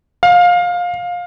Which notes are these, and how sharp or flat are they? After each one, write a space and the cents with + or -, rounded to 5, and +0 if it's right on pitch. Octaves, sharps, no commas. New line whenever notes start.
F5 +20